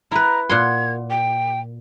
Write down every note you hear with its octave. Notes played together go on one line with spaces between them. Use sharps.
E4 B4 A#5
A#2 F#5 C6 G#6
G5